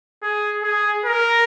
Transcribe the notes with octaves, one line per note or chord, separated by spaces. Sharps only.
G#4
G#4
A#4